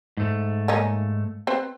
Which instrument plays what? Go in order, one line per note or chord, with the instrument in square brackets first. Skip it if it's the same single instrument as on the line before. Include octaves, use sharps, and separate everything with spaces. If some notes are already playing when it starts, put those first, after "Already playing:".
[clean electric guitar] G#2 A3
[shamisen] A#3 C#4 D#4
C4 B4 C5